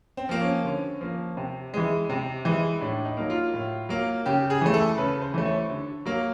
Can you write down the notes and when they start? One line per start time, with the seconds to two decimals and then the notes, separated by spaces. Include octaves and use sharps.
0.17 C4
0.29 F3 A#3
0.41 C#4
0.65 D3 C#4
1.01 F3 A#3
1.37 C3
1.74 E3 G#3
2.10 C3
2.45 E3 G#3
2.81 A2 D4
3.05 D#4
3.17 F#3 A#3
3.30 F4
3.54 A2
3.89 F#3 A#3
4.26 C#3 G4
4.50 G#4
4.61 E3 A3
4.74 A4
4.98 C#3 B4
5.21 C5
5.34 E3 A3
5.46 C#5
5.70 D3
6.05 F#3 A#3